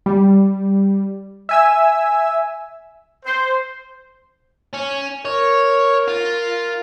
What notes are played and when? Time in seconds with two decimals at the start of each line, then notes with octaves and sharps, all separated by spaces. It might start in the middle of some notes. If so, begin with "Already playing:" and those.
0.06 G3
1.49 E5 G#5 E6
3.25 C5
4.74 C#4
5.25 A#4 C#5
6.08 F4